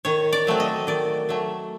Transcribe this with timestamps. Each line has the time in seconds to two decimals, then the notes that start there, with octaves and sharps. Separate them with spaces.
0.05 D#3 C#5
0.33 D5
0.47 F#3 A3 C4
0.60 D#5
0.87 D#3 D5
1.29 F#3 A3